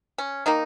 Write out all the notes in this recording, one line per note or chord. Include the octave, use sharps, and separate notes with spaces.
C#4
D#3 A#3 D#4